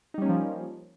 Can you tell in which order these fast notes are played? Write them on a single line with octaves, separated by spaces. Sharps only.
D#4 G3 C#4 A#3 F3